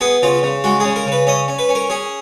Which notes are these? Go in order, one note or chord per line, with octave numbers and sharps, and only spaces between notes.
B3 G#4
C#3 F4
C#3
G#3 F#4
C#3 G#4
A#4
C#3
B4
C#4 D#5
C#4
B4
C#4
A#4
C#4 G#4